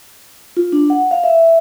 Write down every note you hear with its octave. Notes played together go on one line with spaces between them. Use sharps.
F4
D4
F#5
F5
E5